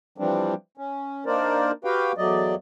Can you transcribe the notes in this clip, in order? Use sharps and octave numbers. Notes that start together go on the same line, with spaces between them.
E3 F3 G3 C4 D4
C#4
A#3 D4 D#4 A#4 C5 D5
F#4 G4 B4 F5 G5
E2 F#3 A3 D5 D#5